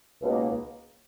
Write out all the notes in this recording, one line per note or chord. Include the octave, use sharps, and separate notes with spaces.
C#2 B2 A#3 D#4